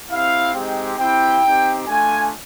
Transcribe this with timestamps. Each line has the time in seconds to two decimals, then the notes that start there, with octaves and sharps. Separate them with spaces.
0.09 C4 E4 G4 F5
0.54 G#3 C4 D#4 G4
0.98 C4 E4 G4 G5
1.43 C4 D#4 G4
1.87 A3 D4 F4 G#5